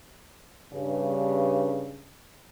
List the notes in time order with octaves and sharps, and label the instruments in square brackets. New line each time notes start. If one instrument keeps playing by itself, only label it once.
[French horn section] G2 C#3